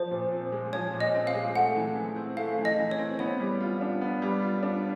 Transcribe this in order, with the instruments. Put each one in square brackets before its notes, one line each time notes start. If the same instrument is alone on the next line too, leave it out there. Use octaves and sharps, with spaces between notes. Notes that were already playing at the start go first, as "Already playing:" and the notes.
Already playing: [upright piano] F3 [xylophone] C5
[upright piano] A#2
C4
G#3
[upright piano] F3 [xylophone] C#5
[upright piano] A#2
[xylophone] D#5
[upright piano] C4
[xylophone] F5
[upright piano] G#3
[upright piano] A3 [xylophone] F#5
[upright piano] E3
E3
C4
[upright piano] A3 [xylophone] F5
[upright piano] E3
[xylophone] D#5
[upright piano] E3
[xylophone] C#5
[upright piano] C4
[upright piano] B3 [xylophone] C#5
[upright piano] G3
F4
D4
B3
G3
F4
D4